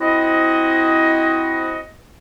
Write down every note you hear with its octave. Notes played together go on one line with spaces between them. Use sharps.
C4 E4 F#4 D#5